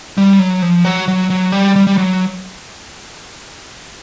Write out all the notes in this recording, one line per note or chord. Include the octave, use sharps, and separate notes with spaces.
G3
F#3
F3
F#3
F#3
F#3
G3
G3
G3
F#3